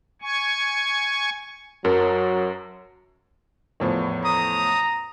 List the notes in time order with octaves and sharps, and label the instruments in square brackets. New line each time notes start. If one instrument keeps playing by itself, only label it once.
[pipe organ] G#5 C#6
[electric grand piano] F#2 [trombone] F#3 [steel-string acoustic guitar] A#4 A5
[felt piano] E2 A2 F3
[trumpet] A#5 [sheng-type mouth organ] D#6